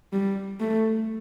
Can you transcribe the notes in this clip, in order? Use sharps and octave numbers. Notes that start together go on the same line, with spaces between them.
G3
A3